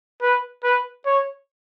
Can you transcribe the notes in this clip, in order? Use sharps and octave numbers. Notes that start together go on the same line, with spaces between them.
B4
B4
C#5